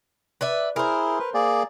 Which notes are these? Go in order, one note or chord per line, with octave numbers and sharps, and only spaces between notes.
B4 D5 E5
E4 G#4 A#4 C5
B4
A#3 G#4 D5